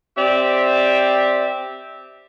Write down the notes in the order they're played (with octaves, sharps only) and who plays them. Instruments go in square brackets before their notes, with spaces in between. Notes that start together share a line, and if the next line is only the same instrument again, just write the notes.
[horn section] C4 G4 D5 E5